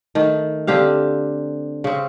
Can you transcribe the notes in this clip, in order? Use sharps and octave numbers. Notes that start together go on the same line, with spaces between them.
D#3 A3
D3 C4 G4 F5
C#3 C4